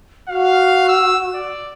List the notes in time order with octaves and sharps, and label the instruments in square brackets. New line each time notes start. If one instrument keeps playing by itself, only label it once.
[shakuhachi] F#4 [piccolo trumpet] F5
[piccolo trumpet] E6
D5